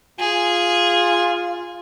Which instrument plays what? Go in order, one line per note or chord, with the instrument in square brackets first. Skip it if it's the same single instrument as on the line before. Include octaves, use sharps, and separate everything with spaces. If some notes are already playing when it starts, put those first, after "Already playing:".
[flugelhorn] F4 [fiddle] G#4